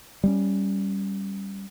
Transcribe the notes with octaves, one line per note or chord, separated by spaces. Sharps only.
G3 G#3 C#4